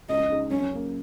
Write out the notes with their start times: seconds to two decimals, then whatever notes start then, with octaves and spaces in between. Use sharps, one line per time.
0.09 C#2 D#5
0.30 C#3 G#3 D#4
0.50 F#2 C#4
0.72 C#3 A#3